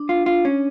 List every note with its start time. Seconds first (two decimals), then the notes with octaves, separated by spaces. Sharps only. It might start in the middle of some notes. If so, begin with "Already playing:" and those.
Already playing: D4
0.09 F4
0.26 F4
0.45 C#4